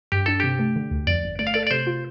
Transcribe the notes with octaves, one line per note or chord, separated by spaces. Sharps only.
G2 G4
D4 A4
C3 G4
A3
D3
D2
F2 D5
G1
A3 D5
F5
A4 D5
D5
C3 C5
F4